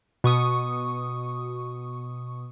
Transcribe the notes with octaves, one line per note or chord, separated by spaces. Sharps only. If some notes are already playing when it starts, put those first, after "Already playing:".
B2 C#6 D#6